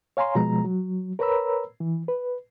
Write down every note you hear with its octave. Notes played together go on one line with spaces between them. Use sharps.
C#5 F5 G#5 A#5 C6
B2 F3 G#3 A#5
F#3
A#4 B4 C#5 A#5 B5 E6
E3
B4